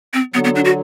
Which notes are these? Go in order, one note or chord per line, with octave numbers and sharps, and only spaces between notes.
C4
D3 F#3 B3
B3
D4
F#4